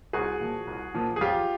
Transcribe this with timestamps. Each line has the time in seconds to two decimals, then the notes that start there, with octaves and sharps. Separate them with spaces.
0.13 C2 F#4 G#4
0.40 A#2 F3
0.67 C2
0.94 A#2 F3
1.16 G#4
1.21 F2 F4 G4